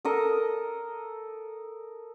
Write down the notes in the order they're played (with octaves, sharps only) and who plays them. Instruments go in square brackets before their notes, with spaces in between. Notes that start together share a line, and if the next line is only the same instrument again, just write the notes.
[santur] A4 A#4 D#5